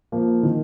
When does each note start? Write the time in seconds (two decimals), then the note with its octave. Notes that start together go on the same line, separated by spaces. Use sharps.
0.12 F3 A#3
0.43 D#3